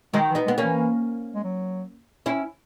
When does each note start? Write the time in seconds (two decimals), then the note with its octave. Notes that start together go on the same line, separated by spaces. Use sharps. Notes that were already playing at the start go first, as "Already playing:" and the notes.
0.14 D#3 F#3 G#3
0.31 E3
0.35 B3 D#4
0.46 G#3 B3
0.58 A#3 C#4
0.63 E3
1.35 G#3
1.44 F#3
2.26 C#4 E4